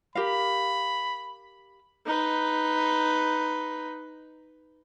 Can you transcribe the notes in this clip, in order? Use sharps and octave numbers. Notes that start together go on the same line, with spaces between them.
G4 A#4 F5 B5
D#4 B4